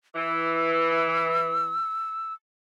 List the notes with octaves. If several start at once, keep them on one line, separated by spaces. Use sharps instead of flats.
E3 E6